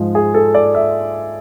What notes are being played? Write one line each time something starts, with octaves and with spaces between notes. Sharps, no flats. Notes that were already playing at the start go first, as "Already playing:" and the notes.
Already playing: G#2 F3 G#3
G#4
A4
D5
E5